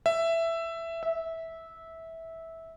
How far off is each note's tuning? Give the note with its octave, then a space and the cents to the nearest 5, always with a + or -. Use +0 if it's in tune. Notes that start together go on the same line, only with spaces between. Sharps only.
E5 +10
E5 -15